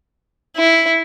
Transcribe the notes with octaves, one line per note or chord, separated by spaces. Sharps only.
E4